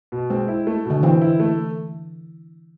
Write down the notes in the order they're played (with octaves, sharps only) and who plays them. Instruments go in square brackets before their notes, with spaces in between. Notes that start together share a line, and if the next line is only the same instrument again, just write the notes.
[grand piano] B2
[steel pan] G#3 [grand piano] C4
[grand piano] E4
A3
[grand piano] B2 [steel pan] D3
[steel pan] E3 [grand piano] C4
[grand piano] E4
A3